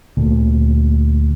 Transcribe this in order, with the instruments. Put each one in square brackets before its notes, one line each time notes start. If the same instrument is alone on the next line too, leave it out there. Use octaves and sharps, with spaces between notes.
[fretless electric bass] D2 A#2